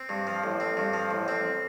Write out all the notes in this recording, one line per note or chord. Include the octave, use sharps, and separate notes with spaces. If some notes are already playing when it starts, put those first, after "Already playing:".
Already playing: C4
G2
F3
A1
C4
G2
F3
A1
C4